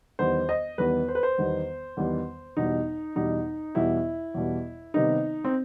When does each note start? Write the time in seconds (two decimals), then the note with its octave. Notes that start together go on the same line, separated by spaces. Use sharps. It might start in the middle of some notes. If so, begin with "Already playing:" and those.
0.19 E2 D#3 G3 B3 C5
0.49 D#5
0.78 E2 D#3 G3 B3 B4
1.08 C5
1.15 B4
1.23 C5
1.38 E2 D#3 G3 B3
1.97 E2 D#3 G3 B3
2.57 E2 B2 G3 D#4
3.16 E2 B2 G3 D#4
3.75 E2 B2 G3 E4
4.34 E2 B2 G3
4.94 C3 D#3 G3 B3 D#4
5.44 C4